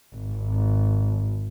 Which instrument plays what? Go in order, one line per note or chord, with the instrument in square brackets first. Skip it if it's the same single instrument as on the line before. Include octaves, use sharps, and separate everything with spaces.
[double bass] G#1